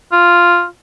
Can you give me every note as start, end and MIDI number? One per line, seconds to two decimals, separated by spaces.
0.13 0.65 65